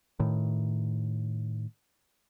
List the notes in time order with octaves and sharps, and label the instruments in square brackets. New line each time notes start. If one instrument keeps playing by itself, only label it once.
[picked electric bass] A2 D#3